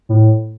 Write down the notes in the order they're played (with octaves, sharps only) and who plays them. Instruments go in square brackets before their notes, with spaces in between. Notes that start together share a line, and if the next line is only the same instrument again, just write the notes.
[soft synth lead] A2